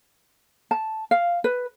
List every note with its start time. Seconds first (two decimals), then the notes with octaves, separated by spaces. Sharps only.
0.71 A5
1.11 F5
1.44 B4